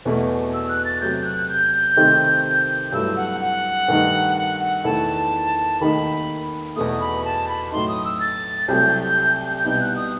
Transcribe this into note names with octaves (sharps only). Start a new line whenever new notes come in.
E2 B2 A3
E6
F#6
A6
C3 F#3 A3 G6
F#6
G6
C3 D#3 A3 C4 D#4
G6
G2 F#3 A3 E4 E6
F#5
F#5
G2 D#3 A3 D#4
F#5
F#5
E2 D#3 A3 E4 A5
D#2 D#3 A3 D#4 B5
E2 B2 A3 D#6
B5
A5
B5
A2 F#3 A3 D#4 C6
D#6
E6
A6
C2 C3 F#3 A3 G6
C2 B2 G3 B3 D#4 G6
F#6
D#6